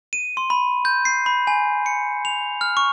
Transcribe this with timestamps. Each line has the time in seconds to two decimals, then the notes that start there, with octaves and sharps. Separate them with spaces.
0.13 D#7
0.37 C6
0.50 B5
0.85 G6
1.05 C7
1.26 B5
1.47 G#5
1.86 C#7
2.25 F7
2.61 F6
2.77 C#6